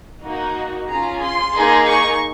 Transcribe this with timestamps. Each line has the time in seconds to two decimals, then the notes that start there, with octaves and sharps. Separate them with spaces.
0.23 A#3 D#4 F#4
0.88 C#4 F4 G#4 A#5
1.21 C6
1.54 A#3 D#4 G#4
1.87 C#6